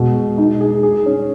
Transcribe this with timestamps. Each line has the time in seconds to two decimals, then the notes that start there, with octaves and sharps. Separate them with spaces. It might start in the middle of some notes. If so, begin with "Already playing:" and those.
Already playing: B2 G#3
0.16 G#3
0.38 D#4
0.61 G#4
0.83 G#4
1.06 C#4